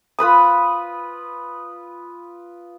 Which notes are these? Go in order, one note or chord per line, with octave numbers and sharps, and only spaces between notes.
F4 B4 B5 D#6